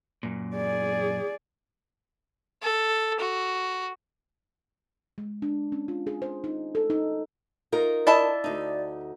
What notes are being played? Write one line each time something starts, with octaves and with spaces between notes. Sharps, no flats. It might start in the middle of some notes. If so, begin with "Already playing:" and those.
F#2 A#2
G#4 D5
A4
F#4
G#3
D4
C#4
F4
G#4
C5
D#4
A4
D#4
D#4 F4 A#4
E4 D5 D#5 A5
D2 D#4